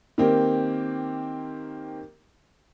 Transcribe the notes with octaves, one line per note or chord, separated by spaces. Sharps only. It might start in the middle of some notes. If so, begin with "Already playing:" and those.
D#3 A#3 C4 G4